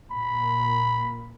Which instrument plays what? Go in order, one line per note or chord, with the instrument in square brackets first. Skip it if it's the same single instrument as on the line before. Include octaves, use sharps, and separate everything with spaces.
[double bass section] A#2 [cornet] B5